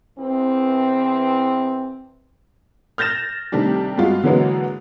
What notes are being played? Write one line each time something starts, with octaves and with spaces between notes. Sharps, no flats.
E2 E3 C4
F6 G6 A6 A#6 E7
C3 D#3 G3 A3 D4 G4
G2 G#3 F4 F#4
D3 E3 F#3 G#3 A#3 B3